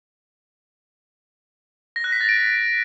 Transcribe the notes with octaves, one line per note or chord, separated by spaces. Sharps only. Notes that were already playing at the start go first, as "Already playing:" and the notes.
A#6
F#6
B6
A6
D7